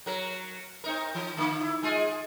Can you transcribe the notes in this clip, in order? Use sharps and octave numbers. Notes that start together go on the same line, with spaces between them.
F#3 A#4
C4 D#4 A#4
E3
D3 A#3
E4
G#3 F4 G#4